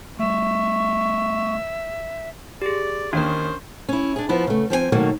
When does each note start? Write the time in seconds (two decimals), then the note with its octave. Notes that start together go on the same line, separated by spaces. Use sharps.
0.19 G3 A3 E5 C#6
2.62 G4 G#4 D5
3.13 D#2 A#3 C#4 D4 A#4 C5
3.89 C#4 E4
4.16 D4 G#4
4.29 F3 B3 E4
4.47 C#3 A3
4.70 F3 C4 G#4 G#5
4.92 B2 D#3 F#3 A3 A#3